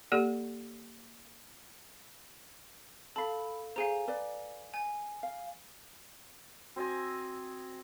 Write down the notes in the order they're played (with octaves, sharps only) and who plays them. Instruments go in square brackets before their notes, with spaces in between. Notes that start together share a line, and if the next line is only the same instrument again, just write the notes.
[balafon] A#3 G4 A4 D5
[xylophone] A4 F5 [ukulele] A5 B5
[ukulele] G#4 C5 [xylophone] F5 G#5 A#5
[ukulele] B4 D5
[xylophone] G#5
[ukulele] F5
[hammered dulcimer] C4 D#5 G#5 [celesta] F#4